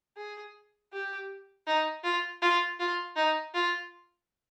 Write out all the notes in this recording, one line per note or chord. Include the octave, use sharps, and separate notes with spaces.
G#4
G4
D#4
F4
F4
F4
D#4
F4